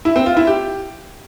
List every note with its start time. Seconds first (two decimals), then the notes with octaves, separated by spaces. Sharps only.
0.05 E4
0.16 C4
0.26 F4
0.37 E4
0.47 G4